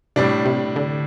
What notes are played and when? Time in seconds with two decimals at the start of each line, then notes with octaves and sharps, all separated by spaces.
0.16 A2 C3 G3 D4
0.46 C3
0.76 D3